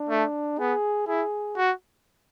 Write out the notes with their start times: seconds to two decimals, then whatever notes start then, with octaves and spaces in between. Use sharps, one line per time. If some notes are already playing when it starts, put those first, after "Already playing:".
Already playing: D4
0.09 A3
0.59 B3 G#4
1.08 E4 G#4
1.57 F#4